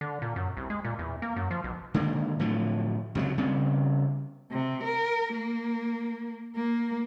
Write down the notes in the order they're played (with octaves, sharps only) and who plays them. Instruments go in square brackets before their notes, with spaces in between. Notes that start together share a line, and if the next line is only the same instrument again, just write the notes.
[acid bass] D3
A#2
F#2
C2
G#3
A#2
E2
A#3
F#2
F3
B1
[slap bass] D3 D#3 G#3 A#3
A2 D3 F3 F#3
C#2 C3 E3 F#3
C#3 G3 B3 C4
[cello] C3
A#4
A#3
A#3